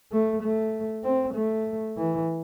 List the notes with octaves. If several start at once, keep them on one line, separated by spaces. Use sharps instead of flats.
A3
A3
C4
A3
E3